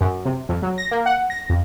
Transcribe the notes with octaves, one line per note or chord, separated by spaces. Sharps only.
F#2
C3
F2
F#3
A#6
A#3
F#5
A#6
F2